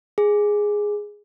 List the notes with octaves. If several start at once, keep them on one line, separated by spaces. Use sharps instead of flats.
G#4